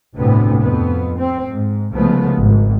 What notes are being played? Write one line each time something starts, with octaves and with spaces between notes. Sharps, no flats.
G1 D2 A2 C3 B3
F2 B3
C4
G#2
C2 C#3 F3 G#3 A3 B3
G#1